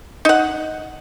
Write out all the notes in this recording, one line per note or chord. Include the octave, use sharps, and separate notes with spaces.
D#4 F#5